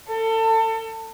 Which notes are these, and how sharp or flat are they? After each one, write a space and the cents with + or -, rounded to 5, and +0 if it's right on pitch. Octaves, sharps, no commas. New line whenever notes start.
A4 +30